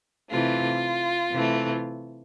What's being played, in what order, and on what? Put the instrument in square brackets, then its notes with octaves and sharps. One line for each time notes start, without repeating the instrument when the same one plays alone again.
[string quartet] C3 E3 A3 F4
C3 E3 A3